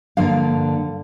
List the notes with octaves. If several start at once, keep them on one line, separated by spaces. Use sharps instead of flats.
G2 D3 F3 A#3 F5